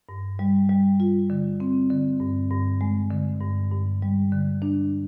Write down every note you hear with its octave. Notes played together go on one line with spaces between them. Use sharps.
G2
G3
G3
F4
D3
C4
D3
G2
G2
G#3
D3
G2
G2
G3
D3
D4